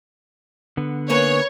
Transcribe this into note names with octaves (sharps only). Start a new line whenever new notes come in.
D3 B3
A#3 C#4 B4 C#5